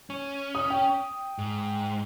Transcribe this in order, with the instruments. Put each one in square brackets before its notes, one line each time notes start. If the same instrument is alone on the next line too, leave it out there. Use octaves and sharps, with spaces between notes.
[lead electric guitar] C#4
[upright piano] D#6
G5
[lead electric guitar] G#2